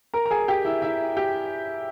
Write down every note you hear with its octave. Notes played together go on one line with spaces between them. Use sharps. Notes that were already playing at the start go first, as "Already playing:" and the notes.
A#4 A#5
A#5
G#4 G#5
G4 G5
E4 E5
E4 E5
G4 G5